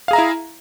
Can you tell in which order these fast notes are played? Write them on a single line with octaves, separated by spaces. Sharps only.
F5 G#4 A#5 E5 E4